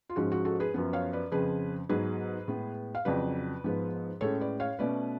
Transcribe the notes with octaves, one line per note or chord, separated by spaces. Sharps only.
F4
G#2 F3 G#3 C#4 F#4
F#4
F#4 A4
G#4 B4
F#2 F3 B3
C#5 F5
B4 D5
F2 C#3 F3 G#4 B4
G#2 F#3 B3 G#4 B4
A2 G#3 B3
F5
F2 C#3 F#3 B4 D5
G#2 F3 G#3 B3
A2 G#3 C#4 A4 C#5
B4 D5
C#5 F5
B2 A3 C#4 B4 D5